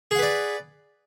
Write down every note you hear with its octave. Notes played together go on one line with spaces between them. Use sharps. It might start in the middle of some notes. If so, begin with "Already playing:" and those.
G#4 B4 D5 F#5